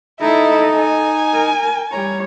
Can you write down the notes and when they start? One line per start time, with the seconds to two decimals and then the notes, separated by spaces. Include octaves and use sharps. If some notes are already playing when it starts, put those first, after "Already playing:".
0.21 D#4 E4 A4 D#5
0.76 G#5
1.33 A#4
1.92 G3 C#5 A#5